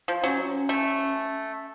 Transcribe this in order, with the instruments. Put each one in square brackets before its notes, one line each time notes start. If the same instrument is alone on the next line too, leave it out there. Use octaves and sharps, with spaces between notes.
[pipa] F3
[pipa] F#3 [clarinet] C#4
[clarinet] C#4
[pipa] A3